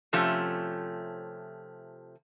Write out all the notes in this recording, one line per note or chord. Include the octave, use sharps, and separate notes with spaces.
C3 F3 A3 C#4 G4